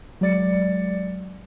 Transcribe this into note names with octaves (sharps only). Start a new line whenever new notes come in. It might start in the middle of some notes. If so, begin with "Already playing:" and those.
F#3 G#3 D5 A6 C#7